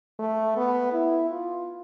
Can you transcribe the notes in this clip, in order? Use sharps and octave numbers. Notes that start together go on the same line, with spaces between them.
A3
B3
E4
F4